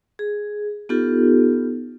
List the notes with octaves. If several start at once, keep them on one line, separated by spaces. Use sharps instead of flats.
G#4
B3 D#4 F4 G4 A4